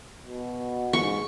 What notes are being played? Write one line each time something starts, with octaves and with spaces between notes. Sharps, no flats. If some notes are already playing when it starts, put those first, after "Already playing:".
B2
G#2 C#6